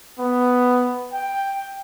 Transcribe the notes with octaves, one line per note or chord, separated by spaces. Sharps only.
B3
G5